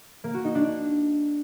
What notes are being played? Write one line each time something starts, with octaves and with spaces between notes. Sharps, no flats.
A#3
F#4
D#4
D4